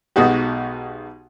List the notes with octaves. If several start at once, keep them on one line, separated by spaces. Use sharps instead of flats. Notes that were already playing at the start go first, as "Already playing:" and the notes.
B1 B2 G#3 D#4 F#4 G4